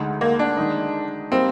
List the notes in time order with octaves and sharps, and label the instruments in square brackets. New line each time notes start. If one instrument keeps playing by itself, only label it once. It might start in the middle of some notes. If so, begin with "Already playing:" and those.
Already playing: [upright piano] D2 D3 G#3 D#4
[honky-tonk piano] A#3
D4
[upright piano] D#3 G#3 D#4
[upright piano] G3 A#3 D#4 A#4 [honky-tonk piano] C4